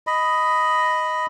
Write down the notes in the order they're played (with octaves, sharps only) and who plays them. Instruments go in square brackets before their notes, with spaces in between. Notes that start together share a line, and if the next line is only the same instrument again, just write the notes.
[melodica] D#5 B5